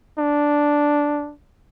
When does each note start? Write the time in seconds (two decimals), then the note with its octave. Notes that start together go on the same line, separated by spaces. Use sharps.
0.18 D4